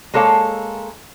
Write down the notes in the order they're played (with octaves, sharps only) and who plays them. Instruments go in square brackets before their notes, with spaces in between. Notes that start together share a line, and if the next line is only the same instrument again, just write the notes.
[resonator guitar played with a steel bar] G#3 A#3 A4 C#5 F5